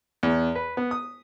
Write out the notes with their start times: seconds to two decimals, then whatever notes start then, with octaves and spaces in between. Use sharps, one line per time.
0.23 E2
0.55 B4
0.77 B3
0.91 D#6